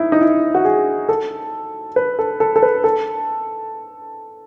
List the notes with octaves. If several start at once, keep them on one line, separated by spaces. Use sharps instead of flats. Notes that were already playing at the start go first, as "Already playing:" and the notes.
Already playing: D#4 E4
D#4
E4
F#4
G#4
A4
B4
A4
A4
A4
B4
A4